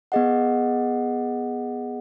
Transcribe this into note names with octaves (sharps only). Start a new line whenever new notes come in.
B3 G#4 D#5 F#5